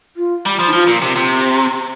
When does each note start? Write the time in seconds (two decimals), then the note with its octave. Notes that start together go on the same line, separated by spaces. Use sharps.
0.17 F4
0.46 G3
0.59 F3
0.68 D#4
0.73 F3 F4
0.87 A#2
1.02 C3
1.16 C3